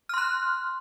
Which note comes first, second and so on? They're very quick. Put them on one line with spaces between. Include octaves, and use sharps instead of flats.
F6 C6 F#6